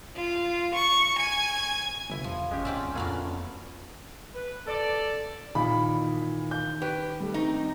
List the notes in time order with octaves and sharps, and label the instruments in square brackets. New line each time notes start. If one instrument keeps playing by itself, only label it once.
[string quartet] F4
C#6
G#5
[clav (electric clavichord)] G1 E4 [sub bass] C3
[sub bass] E2 [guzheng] F3
[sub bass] G1 [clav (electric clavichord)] G#3 G4 [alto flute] C#4
[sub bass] D2 [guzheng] G#2 C4 A5 [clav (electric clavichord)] G4 D5 E5
[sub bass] F2 [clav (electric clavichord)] A#2 D3 F#3 [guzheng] A3 B3 F5
[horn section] B4
A4 D5
[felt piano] A#2 E3 [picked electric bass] D#3 [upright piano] B5
[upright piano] G6
[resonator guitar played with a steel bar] G4 [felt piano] B4
[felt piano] G3 A3
[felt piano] C4 [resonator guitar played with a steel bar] D#4